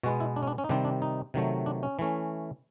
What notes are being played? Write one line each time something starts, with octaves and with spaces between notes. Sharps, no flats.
B2 G#3 B3 F#4
E4
D4
C#4
D4
C#4
D#4
C3 D#3 G3 C4 D4
D4
D#4
C3 D#3 F#3 A3
D4
C#4
E3 A3 C#4